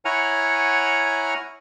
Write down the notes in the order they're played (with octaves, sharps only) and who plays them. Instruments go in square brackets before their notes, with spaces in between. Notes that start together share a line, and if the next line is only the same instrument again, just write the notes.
[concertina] E4 C#5 F#5 G#5 A#5 F6